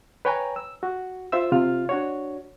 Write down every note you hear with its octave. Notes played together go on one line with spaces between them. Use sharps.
B4 C#5 G5 G#5 A#5
E6
F#4
F4 C5 E5 E6
C3 F4 F6
D4 F#4 C#5